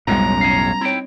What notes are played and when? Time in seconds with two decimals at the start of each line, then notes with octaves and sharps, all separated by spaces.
0.07 B1 F2 A2 G3 G#3 B3 C#4 A#5
0.41 C#5 F5
0.81 C4 D#4 E4 C#5 G5